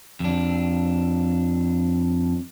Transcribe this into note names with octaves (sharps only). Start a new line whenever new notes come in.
F2 D4